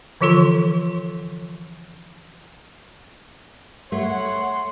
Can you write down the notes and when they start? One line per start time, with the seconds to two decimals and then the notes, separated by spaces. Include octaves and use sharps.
0.21 D3 E3 F3 F4 A4 C6
3.92 A3 C#5 F#5 C6